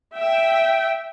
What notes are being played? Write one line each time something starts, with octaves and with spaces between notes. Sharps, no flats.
E5 G5